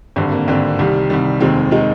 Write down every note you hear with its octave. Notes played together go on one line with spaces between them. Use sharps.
G#1 G2 D3 C4
A#3
G#1 G2 D3 C4
C2 C3 D#3 G3
C2 C3 D#3 G3
F1 D#2 D#3 G#3 C4
D#3 G#3 D#4